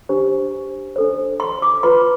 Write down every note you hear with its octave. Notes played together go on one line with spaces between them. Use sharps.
D4 G4 C5
D4 A4 C5
C6
D6
F4 B4 C6